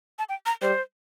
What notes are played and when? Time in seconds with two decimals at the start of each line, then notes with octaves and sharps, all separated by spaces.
0.19 A5
0.29 G5
0.46 A#5
0.62 G3 C5